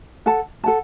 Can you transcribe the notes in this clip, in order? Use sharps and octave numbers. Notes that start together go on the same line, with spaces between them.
A4 F#5 A5
A4 F#5 A5